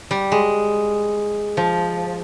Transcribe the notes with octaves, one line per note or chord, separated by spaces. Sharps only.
G3
G#3
F3